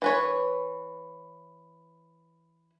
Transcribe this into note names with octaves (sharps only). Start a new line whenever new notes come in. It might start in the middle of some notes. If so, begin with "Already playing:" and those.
E3 B4 C#5